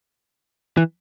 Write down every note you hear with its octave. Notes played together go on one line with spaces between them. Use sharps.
E3